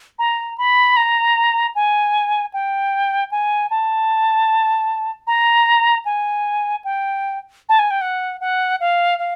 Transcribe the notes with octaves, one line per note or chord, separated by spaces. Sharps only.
A#5
B5
A#5
G#5
G5
G#5
A5
A#5
G#5
G5
A5
G#5
G5
F#5
F#5
F5
F5